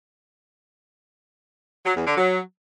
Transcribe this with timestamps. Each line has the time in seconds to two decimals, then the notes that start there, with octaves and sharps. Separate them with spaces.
1.84 F#3
1.95 E2
2.05 D3
2.16 F#3